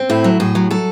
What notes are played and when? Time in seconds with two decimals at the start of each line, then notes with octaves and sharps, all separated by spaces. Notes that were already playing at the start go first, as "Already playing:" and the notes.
Already playing: C4
0.10 A2 E4
0.24 F#3
0.40 A2 G#4
0.55 F#3
0.71 F#3 A4